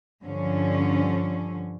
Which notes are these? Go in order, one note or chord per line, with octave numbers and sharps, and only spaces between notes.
G2 D3 F3 C#4